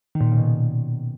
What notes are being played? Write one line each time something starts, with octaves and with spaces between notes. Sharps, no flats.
D#3
A#2
D#3
C#3
B2